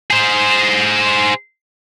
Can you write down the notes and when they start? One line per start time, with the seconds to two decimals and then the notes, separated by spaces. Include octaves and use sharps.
0.10 G#4 C5